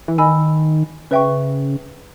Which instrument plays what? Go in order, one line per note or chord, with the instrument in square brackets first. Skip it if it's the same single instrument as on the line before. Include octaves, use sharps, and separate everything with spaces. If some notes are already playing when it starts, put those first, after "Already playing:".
[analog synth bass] E3
[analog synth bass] D#3 [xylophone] D#5 G#5 B5 E6
[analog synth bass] C#3 [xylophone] B4 E5 G5 C#6